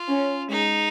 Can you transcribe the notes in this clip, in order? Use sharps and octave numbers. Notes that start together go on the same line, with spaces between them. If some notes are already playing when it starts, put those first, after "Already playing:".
Already playing: F4
C#4
G#3 D#4